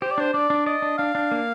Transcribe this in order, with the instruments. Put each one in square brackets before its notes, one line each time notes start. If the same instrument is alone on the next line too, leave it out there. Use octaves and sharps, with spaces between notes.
[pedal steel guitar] G4 [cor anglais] C5
[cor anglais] D5
[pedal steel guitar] D4 [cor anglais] C5
[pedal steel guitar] D4 [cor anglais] D5
[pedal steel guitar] D4
[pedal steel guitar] D5 [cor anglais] D#5
[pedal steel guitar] D4
[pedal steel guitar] D4 [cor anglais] F5
[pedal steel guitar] D4
A#3